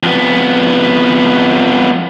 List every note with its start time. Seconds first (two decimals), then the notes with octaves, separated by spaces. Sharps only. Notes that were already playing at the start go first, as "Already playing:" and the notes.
0.03 F2 B3